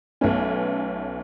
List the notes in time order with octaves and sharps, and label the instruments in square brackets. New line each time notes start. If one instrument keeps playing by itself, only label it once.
[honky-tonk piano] B1 A3 B3 C#4